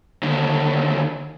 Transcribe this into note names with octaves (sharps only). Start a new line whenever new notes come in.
D#2 D3